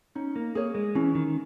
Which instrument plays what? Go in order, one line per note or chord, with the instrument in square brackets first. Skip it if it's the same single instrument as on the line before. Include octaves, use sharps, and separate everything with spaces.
[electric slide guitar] C#4 [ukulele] D#4
[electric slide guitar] A#3
[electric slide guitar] A#3 [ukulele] G#4 C#5
[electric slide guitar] G#3
[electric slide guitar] E3 [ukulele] C#4
[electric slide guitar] D#3